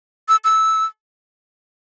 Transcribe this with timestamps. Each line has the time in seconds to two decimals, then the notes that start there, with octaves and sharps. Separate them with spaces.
0.29 E6
0.44 E6